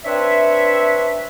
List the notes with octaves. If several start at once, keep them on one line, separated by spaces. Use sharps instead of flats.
C4 D4 B4 C#5 E5